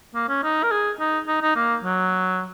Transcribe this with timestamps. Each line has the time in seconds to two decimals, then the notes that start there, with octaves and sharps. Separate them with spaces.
0.15 A#3
0.29 C#4
0.43 D#4
0.63 A#4
0.71 G#4
1.00 D#4
1.28 D#4
1.42 D#4
1.56 A#3
1.84 F#3